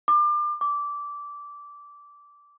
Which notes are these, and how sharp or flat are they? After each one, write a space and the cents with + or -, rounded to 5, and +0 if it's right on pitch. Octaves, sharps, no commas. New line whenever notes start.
D6 +30
D6 -15